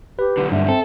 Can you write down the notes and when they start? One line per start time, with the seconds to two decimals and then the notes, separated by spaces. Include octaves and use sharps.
0.19 G4 B4
0.37 B1 D3
0.52 G2 E5
0.68 C4 A4